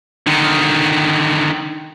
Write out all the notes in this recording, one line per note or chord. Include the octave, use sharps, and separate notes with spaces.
D3 D#3